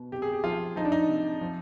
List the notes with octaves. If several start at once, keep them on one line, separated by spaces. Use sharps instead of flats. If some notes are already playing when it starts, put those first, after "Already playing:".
Already playing: B2
C3 G4
G#4
G4
F3 F4
F3 D#4
D4
D#4
C3
F3